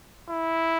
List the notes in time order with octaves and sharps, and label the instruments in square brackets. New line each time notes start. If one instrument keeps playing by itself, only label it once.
[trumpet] E4